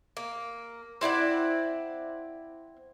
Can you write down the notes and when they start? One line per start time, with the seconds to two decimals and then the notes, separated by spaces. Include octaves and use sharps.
0.17 A#3
1.01 C4 E4 D5 F#5